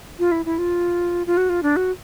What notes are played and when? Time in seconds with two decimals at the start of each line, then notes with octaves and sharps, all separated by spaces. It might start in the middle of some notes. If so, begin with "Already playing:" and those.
0.19 F4
0.32 E4
0.46 E4
0.58 F4
1.27 F4
1.37 F#4
1.49 F4
1.63 D4
1.76 F#4